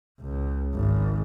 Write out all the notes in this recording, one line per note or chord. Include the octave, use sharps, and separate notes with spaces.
C#2
G#1